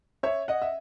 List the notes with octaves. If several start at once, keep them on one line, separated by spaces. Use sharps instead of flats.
C#5 E5
D#5 F#5
E5